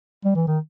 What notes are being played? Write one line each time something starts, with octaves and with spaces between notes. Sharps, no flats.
G3
E3
D#3